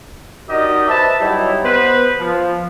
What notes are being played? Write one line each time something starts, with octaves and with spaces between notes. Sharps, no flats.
D#4 F#4 G4 A#4 D5 D#5
B4 C5 E5 A5
F#3 G3 D#4 E4
B3 B4 C5
F3